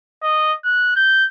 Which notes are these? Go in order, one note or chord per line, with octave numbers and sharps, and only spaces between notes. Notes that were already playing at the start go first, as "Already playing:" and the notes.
D#5
F#6
G6